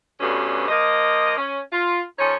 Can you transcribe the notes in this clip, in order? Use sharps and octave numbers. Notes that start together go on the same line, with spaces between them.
D2 G2 B2 D3 C#4
F3 A#3 D#5
C#4
F4
F3 C#4 D#4 A4 C#5